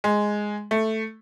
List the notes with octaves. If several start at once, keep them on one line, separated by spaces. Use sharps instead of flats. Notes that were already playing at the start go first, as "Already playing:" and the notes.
G#3
A3